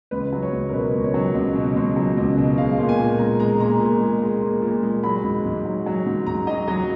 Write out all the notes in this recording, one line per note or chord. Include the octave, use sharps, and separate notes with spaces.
C#2 B4
F#3
C#5
C#2
A#4
B2 B4
C#2
C#5
F#3
C#2
B2
C#2
F#3
C#2
B2
G#3 F5
A#2
G#5
A#2
G#3 A#5
G#3 A#5
A#2 A#5
A#2
G#3
G#3
A#2
A#2
G#3
F#3 B5
G#2
G#2
F#3
F#3
G#2
G#2 A#5
F#3 D#5
F#3 D#5